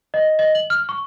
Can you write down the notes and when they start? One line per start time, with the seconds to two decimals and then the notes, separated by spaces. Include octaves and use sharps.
0.14 D#5
0.39 D#5
0.55 F#7
0.70 F6
0.89 C#6